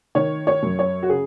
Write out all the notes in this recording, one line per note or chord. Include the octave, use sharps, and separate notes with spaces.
D#3 C#5
C#5
F#2
C#5
F#4
C#3 G#4